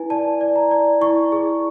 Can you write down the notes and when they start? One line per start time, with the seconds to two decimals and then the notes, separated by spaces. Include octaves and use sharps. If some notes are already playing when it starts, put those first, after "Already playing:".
Already playing: E4 B4 G#5
0.10 D5 A5
0.41 D5
0.56 A#5
0.71 D5
1.01 E4 C#6
1.32 G#4